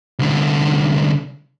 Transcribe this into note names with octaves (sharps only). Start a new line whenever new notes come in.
C2 D3